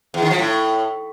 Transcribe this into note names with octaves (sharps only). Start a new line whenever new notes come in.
E2
D#3
F3
A2